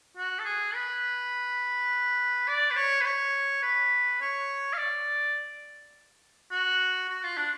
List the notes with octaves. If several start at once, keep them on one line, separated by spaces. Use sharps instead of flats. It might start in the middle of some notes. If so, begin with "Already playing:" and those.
F#4
A4
G#4
B4
D5
B4
C#5
B4
C#5
B4
C#5
F5
D5
F#4
F#4
F4
D4